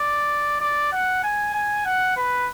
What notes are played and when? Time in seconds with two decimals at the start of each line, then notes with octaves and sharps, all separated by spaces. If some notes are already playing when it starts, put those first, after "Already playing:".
Already playing: D5
0.60 D5
0.92 F#5
1.23 G#5
1.54 G#5
1.85 F#5
2.17 B4